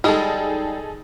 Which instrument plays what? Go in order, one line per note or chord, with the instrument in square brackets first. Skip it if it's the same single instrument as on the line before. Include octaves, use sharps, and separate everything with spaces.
[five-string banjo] G3 G#3 [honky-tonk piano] D#4 G#4 A4